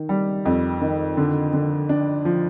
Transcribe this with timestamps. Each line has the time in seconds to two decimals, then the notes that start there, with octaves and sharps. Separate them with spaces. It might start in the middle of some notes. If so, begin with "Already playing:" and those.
Already playing: D#3
0.09 G3
0.45 F2
0.81 D#3
1.17 D3
1.53 D3
1.89 D4
2.25 F3